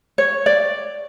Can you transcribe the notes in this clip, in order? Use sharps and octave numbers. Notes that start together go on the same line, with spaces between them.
C#5
D5